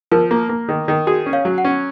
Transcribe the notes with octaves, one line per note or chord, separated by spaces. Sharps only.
F3 A#4
A#3
A#3
D#3
D#3
F#4 G#4
C#4
C#5 F5
F#3
F#5
C#4